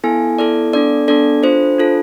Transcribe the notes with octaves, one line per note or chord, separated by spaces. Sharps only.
B3 E4 A4 G#5
B3 E4 A4 D5
B3 D4 A4 D5
B3 D4 A4 D5
D4 F4 A4 C5
D4 F4 A4